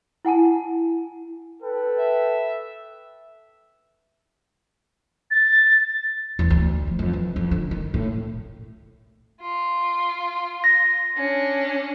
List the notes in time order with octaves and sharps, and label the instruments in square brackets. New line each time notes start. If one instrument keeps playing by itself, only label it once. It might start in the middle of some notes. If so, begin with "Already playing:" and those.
[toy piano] E4 F#5 G#5 A5
[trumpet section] A4 B4 G5
[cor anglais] E5
[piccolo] A6
[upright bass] E2
D2
F3
F2
E3
F2
D3
D#3
A2
[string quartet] F4
[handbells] A#6
[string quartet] C#4 D4